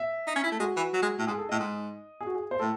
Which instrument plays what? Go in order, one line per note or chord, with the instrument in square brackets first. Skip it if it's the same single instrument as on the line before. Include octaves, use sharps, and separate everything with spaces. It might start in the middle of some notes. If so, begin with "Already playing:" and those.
Already playing: [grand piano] E5
[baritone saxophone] D#4
C#4
E4
A3
[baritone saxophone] G#3 [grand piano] F#4
[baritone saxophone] E3
F#3
G#3
A2
[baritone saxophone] G#2 [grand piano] G#4
[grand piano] A4
[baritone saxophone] A2 [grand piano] D#5
[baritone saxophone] G#2
[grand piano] G#4
F#4
G#4
C5
[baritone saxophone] A2 [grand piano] A4